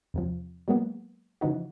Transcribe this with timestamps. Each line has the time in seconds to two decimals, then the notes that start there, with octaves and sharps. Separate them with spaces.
0.14 E2 C3 F3
0.68 F#3 G#3 A#3 B3
1.41 C#3 E3 F3 D#4 F#4